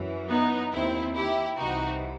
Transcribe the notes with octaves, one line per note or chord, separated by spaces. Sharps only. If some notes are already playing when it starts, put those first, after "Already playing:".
Already playing: F#2 E3
B3 D#4
D#2 D#3 C4 E4
E4 G4
C2 C3 E3 D#4 F#4